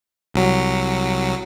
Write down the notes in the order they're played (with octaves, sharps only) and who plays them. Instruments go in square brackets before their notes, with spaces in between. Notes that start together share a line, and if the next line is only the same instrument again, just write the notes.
[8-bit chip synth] C2 F#3